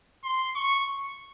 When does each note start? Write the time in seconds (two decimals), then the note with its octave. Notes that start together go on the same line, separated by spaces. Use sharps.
0.24 C6
0.56 C#6